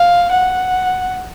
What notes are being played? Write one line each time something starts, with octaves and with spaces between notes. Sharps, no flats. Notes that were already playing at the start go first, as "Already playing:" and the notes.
Already playing: F5
F#5